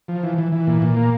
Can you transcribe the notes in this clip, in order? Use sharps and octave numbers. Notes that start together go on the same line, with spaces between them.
F3
E3
E3
E3
A#2
A#2
A#3